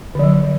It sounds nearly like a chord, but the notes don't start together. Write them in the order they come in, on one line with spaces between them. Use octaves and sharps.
D3 F3 F#3